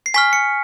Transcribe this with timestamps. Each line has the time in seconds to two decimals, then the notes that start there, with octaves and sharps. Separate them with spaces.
0.06 C7
0.14 G#5 C#6 F6 B6
0.33 C#7